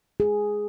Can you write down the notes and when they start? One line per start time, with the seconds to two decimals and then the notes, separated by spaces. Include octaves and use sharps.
0.20 G#4